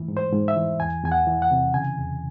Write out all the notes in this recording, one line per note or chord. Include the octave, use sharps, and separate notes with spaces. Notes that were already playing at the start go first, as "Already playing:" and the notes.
Already playing: A2 E3
G#2
C5
G#2
E5
E3
E2 G#5
E2 G#5
F#5
E3
F#5
C3
C#3 G#5
E2